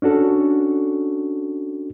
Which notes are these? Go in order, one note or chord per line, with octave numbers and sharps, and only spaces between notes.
C#4 D4 F#4 A4